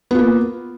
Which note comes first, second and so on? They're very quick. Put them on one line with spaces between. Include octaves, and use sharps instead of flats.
B3 F4 A#3